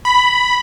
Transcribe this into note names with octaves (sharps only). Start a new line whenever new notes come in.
B5